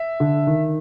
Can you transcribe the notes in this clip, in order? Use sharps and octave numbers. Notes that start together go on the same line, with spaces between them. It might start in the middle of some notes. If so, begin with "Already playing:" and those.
Already playing: E5
D3
D#3